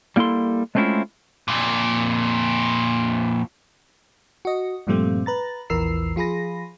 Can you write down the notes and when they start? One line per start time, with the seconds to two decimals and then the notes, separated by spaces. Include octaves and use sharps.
0.16 G3 A#3 E4 A4 C6
0.75 G#3 A3 C4 C#4 E4 F4
1.48 F2 A#2
4.45 F#4 D#5
4.87 G2 A#2 F3 G3 A3 C4
5.26 B4 A#5 A6
5.70 A#1 E2 E3 A#4 E6 C7
6.16 F3 F4 G#4 B5 A#6